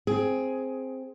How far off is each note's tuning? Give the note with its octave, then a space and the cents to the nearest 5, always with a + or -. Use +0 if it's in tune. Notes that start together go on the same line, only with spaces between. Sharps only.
C4 +0 G#4 +10